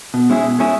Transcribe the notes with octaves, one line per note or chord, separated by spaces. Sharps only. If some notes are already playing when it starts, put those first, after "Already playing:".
B2
G#3 C#4 E4 G#4
B2
G#3 C#4 E4 G#4